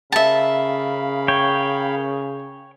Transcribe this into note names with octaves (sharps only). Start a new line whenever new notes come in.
C#3 A#4 E5 F5 A5 B5
C#5 G5